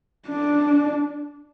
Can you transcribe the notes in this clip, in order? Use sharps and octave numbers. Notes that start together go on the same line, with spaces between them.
D4